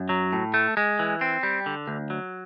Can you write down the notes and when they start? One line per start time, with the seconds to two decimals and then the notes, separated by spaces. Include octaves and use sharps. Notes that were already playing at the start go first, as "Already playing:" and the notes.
Already playing: F#2
0.09 F#3
0.33 A2
0.54 A3
0.77 G#3
0.99 E3
1.21 C4
1.43 G3
1.66 D3
1.88 D2
2.10 F#3